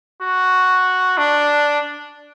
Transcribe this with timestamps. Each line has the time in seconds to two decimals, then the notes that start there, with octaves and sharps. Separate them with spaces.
0.22 F#4
1.18 D4